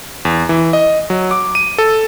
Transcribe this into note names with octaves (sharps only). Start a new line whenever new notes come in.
E2
E3
D#5
F#3
D6
D#7
A4